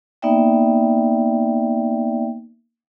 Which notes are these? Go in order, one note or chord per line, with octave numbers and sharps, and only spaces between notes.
A#3 B3 D#4 D5 E5 G5